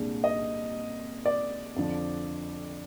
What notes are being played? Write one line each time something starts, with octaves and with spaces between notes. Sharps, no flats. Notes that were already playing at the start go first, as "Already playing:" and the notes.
Already playing: C2 A#2 G#3 D4
D#5
D5
F2 D3 F3